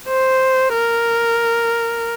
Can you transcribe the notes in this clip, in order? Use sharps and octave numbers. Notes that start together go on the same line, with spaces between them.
C5
A#4